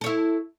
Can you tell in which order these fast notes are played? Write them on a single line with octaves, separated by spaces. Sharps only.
A4 C#5 E4